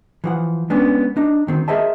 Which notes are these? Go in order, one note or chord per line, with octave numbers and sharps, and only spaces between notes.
E3 F3 F#5
G#3 B3 C#4 D4
D4 D#4
D2 D#3 C4
G#4 A#4 C5 D#5 E5 A5